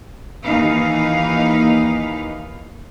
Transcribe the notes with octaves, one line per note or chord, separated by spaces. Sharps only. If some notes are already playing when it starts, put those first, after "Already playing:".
D#2 E3 D#4 B4 F5